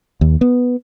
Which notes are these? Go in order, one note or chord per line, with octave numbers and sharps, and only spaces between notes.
D#2
B3